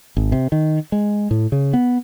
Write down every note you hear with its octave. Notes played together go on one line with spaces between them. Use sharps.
G#1
C3
D#3
G#3
A2
C#3
B3